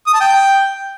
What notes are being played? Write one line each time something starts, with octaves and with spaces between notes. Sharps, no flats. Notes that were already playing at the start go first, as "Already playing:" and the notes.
D#6
A5
G5